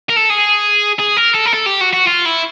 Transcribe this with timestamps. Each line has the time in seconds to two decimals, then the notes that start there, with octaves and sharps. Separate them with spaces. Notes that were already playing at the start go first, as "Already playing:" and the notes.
0.09 A#4
0.16 A4
0.30 G#4
0.99 G#4
1.17 A#4
1.35 A4
1.46 A#4
1.54 A4
1.66 G4
1.81 F#4
1.93 F#4
2.07 F4
2.26 E4